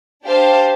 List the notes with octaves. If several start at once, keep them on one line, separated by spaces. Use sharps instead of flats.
D4 G4 C5 F5 A5